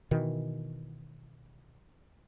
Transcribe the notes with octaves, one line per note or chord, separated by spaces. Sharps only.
B2 D#3 E3